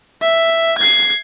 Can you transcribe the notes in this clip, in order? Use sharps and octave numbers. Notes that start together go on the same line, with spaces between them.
E5
G#6 C7